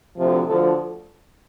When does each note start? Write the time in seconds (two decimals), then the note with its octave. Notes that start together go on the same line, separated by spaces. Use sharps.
0.16 D2 C3 F3
0.47 D2 D3 F3 A4